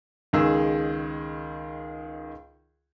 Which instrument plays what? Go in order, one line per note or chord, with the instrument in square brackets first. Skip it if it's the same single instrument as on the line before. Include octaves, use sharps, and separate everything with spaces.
[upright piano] C#2 D#3 G#4 E6